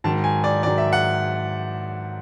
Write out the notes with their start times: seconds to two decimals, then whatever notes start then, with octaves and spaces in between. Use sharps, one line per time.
0.04 G#2 D#3 F#3 A5
0.24 G#5
0.44 D5
0.63 G#2 D#3 F#3 D5
0.78 E5
0.93 F#5